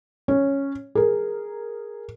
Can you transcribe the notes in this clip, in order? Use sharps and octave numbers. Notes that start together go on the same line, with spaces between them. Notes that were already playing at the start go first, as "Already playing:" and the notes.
C#4 C#5
G#4 A#4